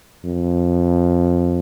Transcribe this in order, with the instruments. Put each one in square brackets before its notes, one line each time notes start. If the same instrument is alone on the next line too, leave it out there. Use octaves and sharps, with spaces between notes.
[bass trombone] F2